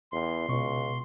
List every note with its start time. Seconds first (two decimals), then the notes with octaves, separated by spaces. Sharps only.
0.12 E2 C6
0.49 C#2 B2 C#6